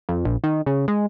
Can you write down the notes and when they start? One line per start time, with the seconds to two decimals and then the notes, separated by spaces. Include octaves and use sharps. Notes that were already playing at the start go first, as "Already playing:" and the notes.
0.09 F2
0.25 A#1
0.44 D#3
0.66 C#3
0.88 G#3